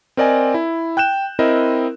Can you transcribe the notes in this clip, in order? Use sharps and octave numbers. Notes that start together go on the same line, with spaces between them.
C4 A#4 D5 D#5 G#5
E4
G5 F#6 G6 E7
C4 E4 A#4 D#5